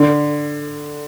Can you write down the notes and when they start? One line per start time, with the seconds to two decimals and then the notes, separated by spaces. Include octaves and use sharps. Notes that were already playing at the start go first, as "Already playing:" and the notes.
Already playing: D3